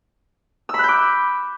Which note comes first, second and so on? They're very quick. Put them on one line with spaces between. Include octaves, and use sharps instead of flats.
E6 B5 F#6 G6 D6